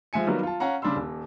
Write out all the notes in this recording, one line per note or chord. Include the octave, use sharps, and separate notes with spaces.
F3 G#3 E5 G#5 C#7
D#3 F#3 G3 A#3 B3
F4 A5
C#4 F5 F#5 A#5
C#3 G3 D4 B5 C6 E6
D#1